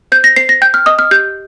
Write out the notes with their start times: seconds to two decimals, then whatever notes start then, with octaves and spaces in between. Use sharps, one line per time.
0.12 C5 G6
0.24 A#6
0.36 C5 C7
0.49 A#6
0.62 G5 G6
0.74 F6
0.86 D#5 D#6
0.99 F6
1.11 G4 G6